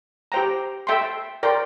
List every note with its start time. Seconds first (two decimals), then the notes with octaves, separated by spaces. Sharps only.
0.32 G4 C5 G5 A#5
0.87 A4 E5 G5 C6
1.43 A#4 D5 G5 C6